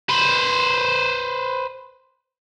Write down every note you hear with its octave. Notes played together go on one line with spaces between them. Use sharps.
B4 C5